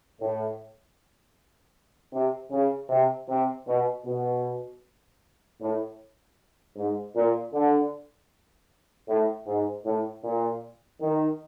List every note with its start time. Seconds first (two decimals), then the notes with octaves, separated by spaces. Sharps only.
0.20 A2
2.13 C3
2.51 C#3
2.89 C3
3.29 C3
3.67 B2
4.05 B2
5.60 A2
6.76 G#2
7.15 A#2
7.53 D3
9.08 A2
9.47 G#2
9.85 A2
10.24 A#2
11.01 D#3